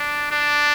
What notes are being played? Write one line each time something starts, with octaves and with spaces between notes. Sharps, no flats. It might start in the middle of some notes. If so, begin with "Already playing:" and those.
Already playing: D4
D4